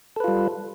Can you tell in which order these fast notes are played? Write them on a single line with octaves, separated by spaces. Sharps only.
A4 B4 F4 G3